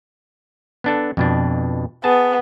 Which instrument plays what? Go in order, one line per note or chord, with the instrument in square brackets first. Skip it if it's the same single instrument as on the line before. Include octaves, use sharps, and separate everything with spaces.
[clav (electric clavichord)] B3 D4 A4
F2 B2 D4
[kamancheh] B3 [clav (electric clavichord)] G#4 A5